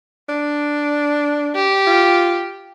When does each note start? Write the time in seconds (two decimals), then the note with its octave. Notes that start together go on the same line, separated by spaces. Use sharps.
0.29 D4
1.55 G4
1.87 F4